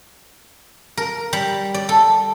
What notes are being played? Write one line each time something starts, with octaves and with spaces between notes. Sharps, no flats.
A#4
G3
D5
A4